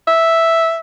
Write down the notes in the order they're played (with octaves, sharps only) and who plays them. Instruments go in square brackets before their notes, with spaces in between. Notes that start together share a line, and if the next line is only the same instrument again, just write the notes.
[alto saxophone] E5